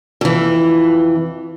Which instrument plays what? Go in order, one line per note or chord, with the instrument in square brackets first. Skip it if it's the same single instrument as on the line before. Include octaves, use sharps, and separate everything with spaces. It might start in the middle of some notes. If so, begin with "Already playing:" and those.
[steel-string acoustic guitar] F2 E3